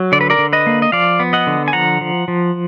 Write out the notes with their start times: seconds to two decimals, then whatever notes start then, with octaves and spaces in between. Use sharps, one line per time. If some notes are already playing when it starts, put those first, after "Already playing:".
Already playing: F#3
0.12 D3 D5
0.21 B4
0.30 A#4 D5
0.38 D3
0.53 B4 D#5
0.67 A#3
0.82 D#5
0.92 F3 D5 F5
1.20 B3
1.33 D#5 F#5
1.47 D3
1.68 G#5
1.73 F3 F#5 A#5
2.01 F3
2.28 F3